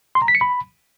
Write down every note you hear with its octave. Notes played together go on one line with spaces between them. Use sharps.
C6
A#5
B6
C#7
B5